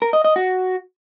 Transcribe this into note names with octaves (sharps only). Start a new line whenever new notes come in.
A#4
D#5
D#5
F#4